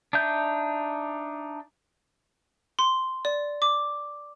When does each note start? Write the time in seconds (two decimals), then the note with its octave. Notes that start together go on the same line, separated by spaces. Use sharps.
0.13 D4 D#4 E5 G6
2.79 C6
3.25 D5
3.62 D6